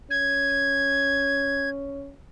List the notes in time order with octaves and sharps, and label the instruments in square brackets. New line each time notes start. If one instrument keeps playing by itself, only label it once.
[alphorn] C#4 [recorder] G#6